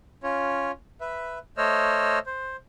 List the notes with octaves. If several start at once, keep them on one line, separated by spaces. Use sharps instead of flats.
C#4 F4 C#5
B4 E5
A3 C5 C#5 D#5 E6 F6
C5